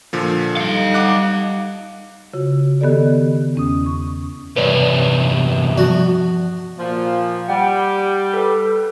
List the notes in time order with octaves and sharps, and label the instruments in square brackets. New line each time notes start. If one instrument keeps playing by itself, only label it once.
[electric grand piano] A#2 D3 F3
[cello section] G3 D#4 [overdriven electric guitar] A4 F5 [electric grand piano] C#7
[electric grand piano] F#5 D6 F#6
[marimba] C#3 F4 F#4
D#3 B3 G4 A4 D5
E2 C#4 D#6
C#6
[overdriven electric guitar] E2 G2 [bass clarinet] C3 [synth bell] B4 C#5 D5
[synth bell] F3 D5 [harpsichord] F#4
[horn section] A#2 F3
[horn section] G3 [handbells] F#5 G5
[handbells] A4 B4